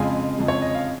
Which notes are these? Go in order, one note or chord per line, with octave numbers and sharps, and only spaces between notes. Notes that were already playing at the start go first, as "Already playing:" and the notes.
Already playing: F2 C#3 G#3 F5 G#5
F2 C#3 G#3
C#5
D#5
F5